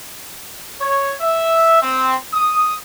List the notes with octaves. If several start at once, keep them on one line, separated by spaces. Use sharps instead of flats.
C#5
E5
C4
D#6